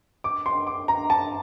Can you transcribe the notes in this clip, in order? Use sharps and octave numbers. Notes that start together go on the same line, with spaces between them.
D6
C6
D6
A#5
A5